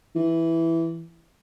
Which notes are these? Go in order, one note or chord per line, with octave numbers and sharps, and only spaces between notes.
E3